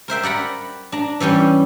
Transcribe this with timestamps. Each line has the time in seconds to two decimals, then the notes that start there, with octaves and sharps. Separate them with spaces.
0.08 A#4 C5 E5 G5
0.23 D5 F#5 A#5 B5
0.92 D4 A#5
1.20 E3 G3 C#4 G4